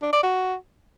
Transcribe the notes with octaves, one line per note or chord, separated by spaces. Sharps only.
D4
D5
F#4